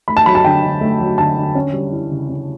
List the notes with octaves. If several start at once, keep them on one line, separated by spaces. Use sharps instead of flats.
A3 B5
A5
F#3 B5
A5
D3 G5
D3
A3
F#3
D3 A5
D3
C#4
G3
E4
C#3
C#4